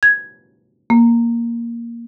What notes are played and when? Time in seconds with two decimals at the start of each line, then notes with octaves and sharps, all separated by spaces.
0.03 G#6
0.90 A#3